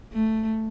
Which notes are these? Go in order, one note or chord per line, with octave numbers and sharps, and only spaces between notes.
A3